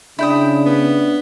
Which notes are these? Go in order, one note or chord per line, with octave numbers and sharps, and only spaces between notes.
C#3 D4 E4 G5 D#6
B3